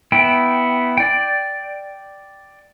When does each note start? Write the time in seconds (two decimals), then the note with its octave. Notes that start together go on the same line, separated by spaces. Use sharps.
0.12 B3 E4 G5
0.97 D5 G5